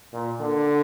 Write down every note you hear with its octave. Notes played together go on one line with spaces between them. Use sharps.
A#2
D3